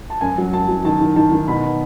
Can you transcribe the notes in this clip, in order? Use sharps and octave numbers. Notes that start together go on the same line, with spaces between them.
A5
F#2 G#5
F#3
F#2 A5
F#3
D#3 A5
D#3
D#3 A5
D#3
B2 B5